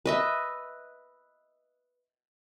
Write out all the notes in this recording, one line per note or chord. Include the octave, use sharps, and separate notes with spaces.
B4 D#5 E5